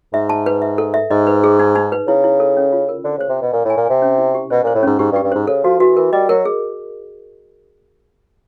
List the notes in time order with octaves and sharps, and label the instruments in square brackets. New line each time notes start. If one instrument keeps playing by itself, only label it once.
[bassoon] G#2 [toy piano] E5
[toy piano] A5
B4
E5
A4
E5
[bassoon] G#2 [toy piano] D#5
[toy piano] B4
G#4
D#4
D#4
B4
[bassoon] C#3 [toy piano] E4
[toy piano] E4
A4
C#4
F4
A#4
[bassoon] D3 [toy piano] C5
[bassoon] C#3 [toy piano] C5
[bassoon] C3
[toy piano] C5
[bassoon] B2
[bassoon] A#2 [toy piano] A#4
[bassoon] A2 [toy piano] G#5
[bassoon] A#2
[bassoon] C3 [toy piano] G#5
[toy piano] C#4
E4
G4
[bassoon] B2 [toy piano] C5
[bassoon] A#2 [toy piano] C5
[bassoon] A2
[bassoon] G#2 [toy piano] C#4
[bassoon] G#2 [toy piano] G4
[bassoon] G2
[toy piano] G4
[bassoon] G2
[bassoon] G#2 [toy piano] C5
[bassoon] C#3 [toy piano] A4
[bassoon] F3 [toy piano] F#4
[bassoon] E3 [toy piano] F#4
[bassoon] E3 [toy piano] A#4
[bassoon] G3 [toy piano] D#5
[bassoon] F#3 [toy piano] A#4
[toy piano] G#4